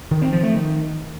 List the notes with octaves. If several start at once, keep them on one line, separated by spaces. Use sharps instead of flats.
D#3
C4
F3
A3
D#3